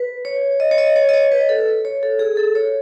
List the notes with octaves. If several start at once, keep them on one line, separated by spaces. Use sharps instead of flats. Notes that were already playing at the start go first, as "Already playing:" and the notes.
Already playing: B4
C#5
D#5
C#5
D#5
C#5
D#5
C#5
B4
A4
C#5
A4
G#4
A4
C#5